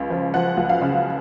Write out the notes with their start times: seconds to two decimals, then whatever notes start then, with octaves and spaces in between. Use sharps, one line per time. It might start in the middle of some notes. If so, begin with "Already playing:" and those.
Already playing: C#2 C#3
0.10 F3
0.34 F3 F#5
0.57 C#2
0.69 F5
0.81 C#3